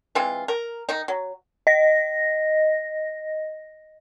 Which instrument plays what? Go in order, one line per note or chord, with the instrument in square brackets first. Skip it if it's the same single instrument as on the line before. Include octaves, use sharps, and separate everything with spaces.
[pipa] E3 G#3 C4 F4
A#4
D#3 D#4
F#3
[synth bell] D#5 A#6